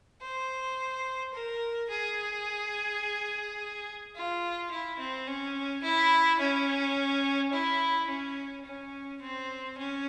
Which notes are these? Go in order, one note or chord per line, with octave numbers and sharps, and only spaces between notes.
C5
A#4
G#4
F4
E4
C4
C#4
E4
C#4
E4
C#4
C#4
C4
C#4